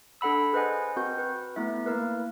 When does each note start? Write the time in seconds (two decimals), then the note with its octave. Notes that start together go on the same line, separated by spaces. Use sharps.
0.21 D4 A4 F#5 B5 E6
0.53 G#4 B4 C5 D#5 F#5 G#5
0.96 C4 F#4 A#4 G6
1.18 B4
1.56 A3 B3 E4 E5
1.86 A#3 E4 A#4 B4